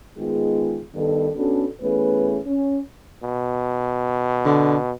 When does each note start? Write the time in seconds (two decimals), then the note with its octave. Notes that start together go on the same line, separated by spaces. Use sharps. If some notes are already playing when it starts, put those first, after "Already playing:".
0.17 D#3 G#3 B3 F4 G#4
0.95 G2 D#3 B3 A4
1.36 B3 C#4 D4 F#4 A4
1.81 E3 A3 B3 C#4 G#4 B4
2.47 C#4
3.23 B2
4.45 D3